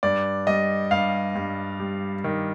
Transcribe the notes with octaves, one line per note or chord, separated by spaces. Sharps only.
G2 D5
G3 D#5
G2 F5
G2
G3
D#3